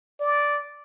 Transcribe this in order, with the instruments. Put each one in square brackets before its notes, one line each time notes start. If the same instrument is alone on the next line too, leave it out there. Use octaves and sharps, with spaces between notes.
[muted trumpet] D5